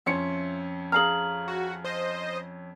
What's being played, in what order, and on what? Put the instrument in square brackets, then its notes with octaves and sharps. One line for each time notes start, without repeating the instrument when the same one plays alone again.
[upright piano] F2 C#4 C#7 [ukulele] F4 E5
[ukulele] G#4 F5 A#5 [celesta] F6 F#7
[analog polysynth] F#4
C5 D#5